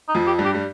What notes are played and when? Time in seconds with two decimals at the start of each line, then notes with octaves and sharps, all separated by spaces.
0.09 D#4
0.15 F2 F3
0.27 G4
0.38 G2 G3
0.45 G4
0.55 G3